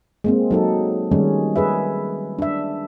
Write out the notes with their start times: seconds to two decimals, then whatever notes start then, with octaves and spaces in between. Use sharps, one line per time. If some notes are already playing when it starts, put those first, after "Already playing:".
0.24 G#3 A#3 C4
0.51 F#3 D#4 A4
1.12 D#3 G3 G#3 C#4
1.56 G#4 B4 E5
2.39 D4 E5